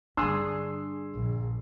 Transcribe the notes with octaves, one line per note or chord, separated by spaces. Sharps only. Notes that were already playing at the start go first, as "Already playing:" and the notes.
G2 D3 D4 G#4 C6 E6
A#1